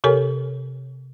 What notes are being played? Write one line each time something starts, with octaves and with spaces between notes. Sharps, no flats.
C3 G4 A4 A#4 C#5 G#5